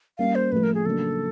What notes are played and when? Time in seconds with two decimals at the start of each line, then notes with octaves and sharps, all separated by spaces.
0.18 G3 A#3 C#4 F5
0.35 C5
0.52 A2 F3 A3 B4
0.63 A#4
0.74 G#4
0.85 C#3 F#3 A#3 D4 A4